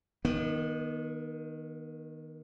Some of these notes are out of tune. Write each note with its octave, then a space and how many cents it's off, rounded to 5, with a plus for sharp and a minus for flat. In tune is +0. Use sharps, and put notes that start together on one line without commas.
D#3 +0 B3 -35